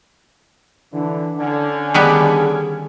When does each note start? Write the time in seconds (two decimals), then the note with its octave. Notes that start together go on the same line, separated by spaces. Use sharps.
0.93 D3 E3 D4
1.38 D3 C#4
1.94 D#3 G3 B3 G#4